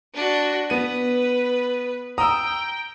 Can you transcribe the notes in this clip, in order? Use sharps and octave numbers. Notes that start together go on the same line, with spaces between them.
D4 F#4
B3 B4 D#7
G5 A#5 D#6 E6